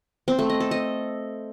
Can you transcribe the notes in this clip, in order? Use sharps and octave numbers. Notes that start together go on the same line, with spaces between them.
C4
A3
D#5
A4
D#5